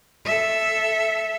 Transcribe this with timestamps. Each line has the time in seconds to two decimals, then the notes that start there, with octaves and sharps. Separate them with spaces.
0.25 A4 E5